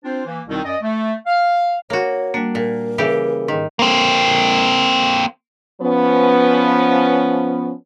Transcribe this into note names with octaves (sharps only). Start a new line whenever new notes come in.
C4 D4 F4 C5
E3 A#3
C2 B2 D#3 C4 D#4
F#2 D5 D#5
A3
F5
A#3 F#4 C#5
G3 A#3 D4
A#2 A#4
C#3 E3 G4 E5
G#2 D#3
A#3 C4
F3 B3 C#4